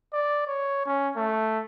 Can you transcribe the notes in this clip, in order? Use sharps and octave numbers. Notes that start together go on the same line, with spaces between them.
D5
C#5
C#4
A3